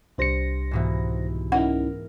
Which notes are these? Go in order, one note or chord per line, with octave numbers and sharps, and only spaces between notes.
C2 D4 G4 C5 A#6 C#7
G#2 B2 E3
C#4 D#4 E4 A#4 F#5